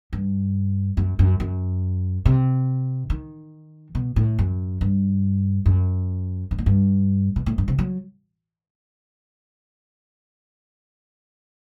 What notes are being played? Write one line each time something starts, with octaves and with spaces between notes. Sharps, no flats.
G2
F#2
F#2
F#2
C3
D#3
B2
A2
F#2
G2
F#2
G2
A2
G2
B2
A2
G2
C3
F#3